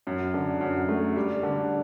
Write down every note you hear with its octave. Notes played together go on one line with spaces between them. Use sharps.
F#2
D3
F#2
A3
G3
D3